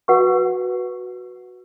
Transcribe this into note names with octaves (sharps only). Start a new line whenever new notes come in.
F#4 B4 F#5 C#6